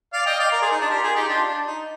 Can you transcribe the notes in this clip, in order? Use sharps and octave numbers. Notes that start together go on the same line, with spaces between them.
D5 F5
D#5 G5
D5 F5
A#4 D5
G#4 C5
D#4
D4 F4
G4 A#4
F4 G#4
D#4 G4
D4 F4
D4
D#4